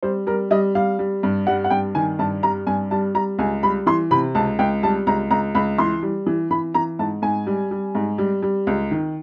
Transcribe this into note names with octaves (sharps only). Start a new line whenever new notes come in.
G3 C5
G3 A#4
G3 D#5
G3 F5
G3
G2
G3 F#5
F#5
G2 G5
D#3 G#5
G2 A5
G3 A#5
G2 G#5
G3 A5
G3 A#5
C#2 G#5
G3 B5
E3 C6
C3 B5
C#2 A5
C#2 G5
G3 A5
C#2 A#5
C#2 A#5
C#2 B5
E3 C6
G3
E3
E3 B5
E3 A#5
G#2 A5
G#2 G#5
G3
G3
G#2
G3
G3
C#2
D#3